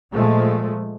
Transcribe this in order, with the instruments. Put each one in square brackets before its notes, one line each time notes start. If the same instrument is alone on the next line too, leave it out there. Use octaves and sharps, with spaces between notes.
[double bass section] A#2 F3 G#3 A3